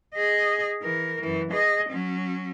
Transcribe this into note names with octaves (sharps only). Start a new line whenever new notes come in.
G#4 D#5
E3 A#4
F#2 E3
G#4 D#5
F#3 C#4